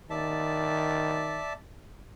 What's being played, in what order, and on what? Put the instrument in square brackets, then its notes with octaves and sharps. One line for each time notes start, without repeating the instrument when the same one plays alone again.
[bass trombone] D#3 [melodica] D5 E5 A5